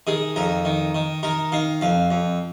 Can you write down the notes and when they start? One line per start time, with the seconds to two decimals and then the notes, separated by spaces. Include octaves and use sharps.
0.07 D#3 G#4
0.36 F2 A#4
0.65 D#3
0.95 D#3
1.23 D#3 A#4
1.52 D#3 F5
1.81 F2 F5
2.11 F2